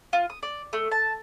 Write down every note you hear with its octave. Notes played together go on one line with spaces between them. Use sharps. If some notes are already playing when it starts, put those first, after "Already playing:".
F4
D#6
D5
A3
A5